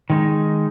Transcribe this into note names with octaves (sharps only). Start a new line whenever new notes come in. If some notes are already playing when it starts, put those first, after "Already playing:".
D#3 G#3 D#4